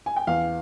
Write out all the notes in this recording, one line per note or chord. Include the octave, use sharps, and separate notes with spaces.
G#5
G5
E2 F5